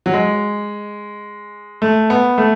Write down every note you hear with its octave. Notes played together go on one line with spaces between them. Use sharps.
F#3
G#3
A3
B3
A3